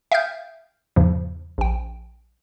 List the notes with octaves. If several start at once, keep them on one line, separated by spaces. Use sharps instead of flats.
E5 F5 G5 D#6 F6 G6
E2 G#2 C#3 F3
A#1 G5